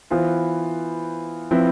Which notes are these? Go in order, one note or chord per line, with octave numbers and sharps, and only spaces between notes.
E3 B3 F4 C5
F3 C4 E4 B4